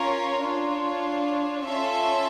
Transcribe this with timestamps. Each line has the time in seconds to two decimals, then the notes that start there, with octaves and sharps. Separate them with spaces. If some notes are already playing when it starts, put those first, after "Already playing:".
Already playing: C#4 F4 A#4 C#5
0.41 D4 F4 C#5
1.65 C#4 F4 A4 E5 A5